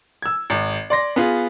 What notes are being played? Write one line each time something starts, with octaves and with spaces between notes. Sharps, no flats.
E6 G#6
G#1
D5 C6 A#6
B3 F4 G#4